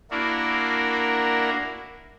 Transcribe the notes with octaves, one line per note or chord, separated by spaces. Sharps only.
A#3 D4 E4 F#4 A#4